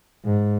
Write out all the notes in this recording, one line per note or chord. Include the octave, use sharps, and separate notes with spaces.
G#2